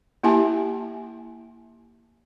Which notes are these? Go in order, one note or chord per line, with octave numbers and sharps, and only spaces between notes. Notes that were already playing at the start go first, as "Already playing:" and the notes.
A#3 E4 G4 E5 G#5 A5